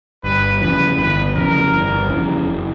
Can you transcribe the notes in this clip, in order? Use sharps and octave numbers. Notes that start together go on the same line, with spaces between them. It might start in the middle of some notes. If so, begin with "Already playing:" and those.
G1 B4
F2 C#3 E3 B4
G1 B4
F2 C#3 E3 A#4
G1
F2 C#3 E3
F#1